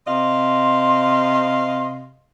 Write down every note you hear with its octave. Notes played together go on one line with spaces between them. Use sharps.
C3 D#5 F5 C6